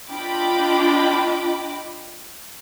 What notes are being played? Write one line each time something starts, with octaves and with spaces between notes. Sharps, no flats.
D4 F4 D#5 G5 B5 D6